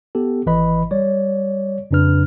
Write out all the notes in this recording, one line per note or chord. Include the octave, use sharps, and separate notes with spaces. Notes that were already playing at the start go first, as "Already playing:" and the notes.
B3 G4 A4
G#1 E3 B4 D#5 B5
G3 C#5 D5
F2 C#3 D4 B4 F6